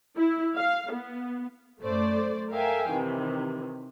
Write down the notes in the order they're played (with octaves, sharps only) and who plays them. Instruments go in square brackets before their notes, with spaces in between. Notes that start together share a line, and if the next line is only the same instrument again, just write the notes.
[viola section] E4
F5
B3
[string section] F#2 A3 C5 D5
A4 A#4 E5 F5 G5 G#5
C3 D#3 E3